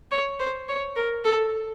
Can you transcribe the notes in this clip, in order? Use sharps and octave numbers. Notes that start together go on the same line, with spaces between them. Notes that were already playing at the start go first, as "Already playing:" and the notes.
C#5
C5
C#5
A#4
A4